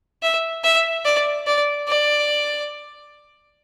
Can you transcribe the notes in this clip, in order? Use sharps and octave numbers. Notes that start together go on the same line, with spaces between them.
E5
E5
D5
D5
D5